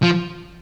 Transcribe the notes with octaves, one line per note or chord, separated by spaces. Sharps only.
F3